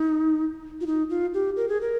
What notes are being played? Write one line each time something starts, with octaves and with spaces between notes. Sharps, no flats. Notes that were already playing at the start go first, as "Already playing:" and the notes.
Already playing: D#4
F4
D#4
F4
G4
A#4
G#4
A#4